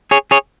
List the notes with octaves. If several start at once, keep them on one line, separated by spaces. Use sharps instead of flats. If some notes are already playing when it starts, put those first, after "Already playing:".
G#4 C#5
G#4 C#5